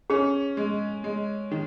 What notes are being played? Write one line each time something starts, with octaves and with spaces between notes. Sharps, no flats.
C#4 G#4
G#3
G#3
D#3